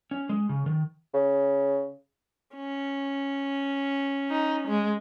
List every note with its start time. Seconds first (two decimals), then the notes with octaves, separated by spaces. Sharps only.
0.11 C#4
0.29 G#3
0.49 C#3
0.66 D#3
1.14 C#3
2.56 C#4
4.31 D#4
4.68 G#3